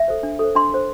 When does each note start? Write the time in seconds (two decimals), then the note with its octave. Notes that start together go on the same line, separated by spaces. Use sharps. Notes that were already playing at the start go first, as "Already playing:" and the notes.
Already playing: E5
0.08 A4 C5
0.23 D4
0.39 A4 C5
0.55 D4 C6
0.72 A4 C5